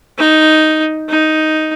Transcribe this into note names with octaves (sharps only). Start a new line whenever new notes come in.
D#4
D#4